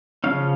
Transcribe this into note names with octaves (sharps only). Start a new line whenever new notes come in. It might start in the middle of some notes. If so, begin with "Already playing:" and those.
C#3 F3 C#4 F5